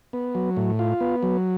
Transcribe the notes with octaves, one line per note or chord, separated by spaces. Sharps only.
B3
F#3
A2
F4
B3
F#3